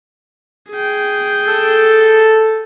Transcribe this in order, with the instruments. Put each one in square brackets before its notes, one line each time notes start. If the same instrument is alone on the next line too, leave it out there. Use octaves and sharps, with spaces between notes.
[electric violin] G#4 G5
[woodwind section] A4